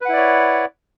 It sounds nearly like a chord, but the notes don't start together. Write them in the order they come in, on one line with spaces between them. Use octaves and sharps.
B4 F#5 E4 D5 C#5